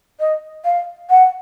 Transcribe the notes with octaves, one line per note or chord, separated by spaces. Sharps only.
D#5
F5
F#5